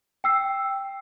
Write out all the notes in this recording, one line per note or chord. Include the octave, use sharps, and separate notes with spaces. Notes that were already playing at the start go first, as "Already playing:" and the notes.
G5 E6 C7